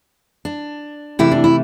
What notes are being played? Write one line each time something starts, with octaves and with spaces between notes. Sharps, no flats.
D4
C3 E3 A3 E4
D4
E4